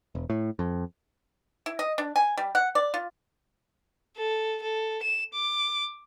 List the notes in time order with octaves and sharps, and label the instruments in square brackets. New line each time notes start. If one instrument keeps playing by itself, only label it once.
[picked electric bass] E1
A2
F2
[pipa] E4
D#5
D4
G#5
G3
F#5
D5
F4
[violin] A4
A4
E7
D6